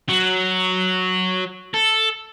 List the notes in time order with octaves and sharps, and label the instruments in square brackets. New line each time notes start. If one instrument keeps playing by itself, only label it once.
[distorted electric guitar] F#3
A4